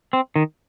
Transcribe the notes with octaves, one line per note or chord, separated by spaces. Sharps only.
C4
D#3